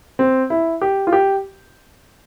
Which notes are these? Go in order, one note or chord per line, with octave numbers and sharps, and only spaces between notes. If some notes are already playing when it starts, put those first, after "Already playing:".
C4
E4
G4
F4
G4